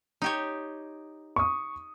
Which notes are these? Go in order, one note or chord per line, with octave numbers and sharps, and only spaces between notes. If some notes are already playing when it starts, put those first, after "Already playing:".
D#4 G4 C#5
C#6 D#6